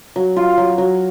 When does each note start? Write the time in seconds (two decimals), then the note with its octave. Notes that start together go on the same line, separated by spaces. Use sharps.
0.16 F#3
0.36 F4
0.58 F#3
0.78 F#3